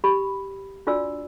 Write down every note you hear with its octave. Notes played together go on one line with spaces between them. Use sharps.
G4 B5
D4 F4 F#4 D5 G#5 E6